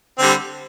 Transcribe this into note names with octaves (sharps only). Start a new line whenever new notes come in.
D3 G3 C4